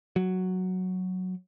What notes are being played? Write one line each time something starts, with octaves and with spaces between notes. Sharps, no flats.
F#3